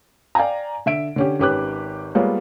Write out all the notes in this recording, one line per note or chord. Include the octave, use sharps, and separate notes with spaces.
D5 F5 G5 G#5 A#5
D3 E5 D7
D3 C#4 G4
G#1 C#4 G4 B4 D6 F#6
G3 G#3 A#3 B3 F4 C#5